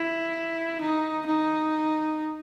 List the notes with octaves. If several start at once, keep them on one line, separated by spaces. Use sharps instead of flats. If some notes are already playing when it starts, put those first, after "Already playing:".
Already playing: E4
D#4
D#4